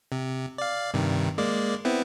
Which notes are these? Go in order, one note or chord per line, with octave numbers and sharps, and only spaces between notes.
C3
D5 F5
G2 C3 D#3
G#3 A#3 D5
B3 C4 E4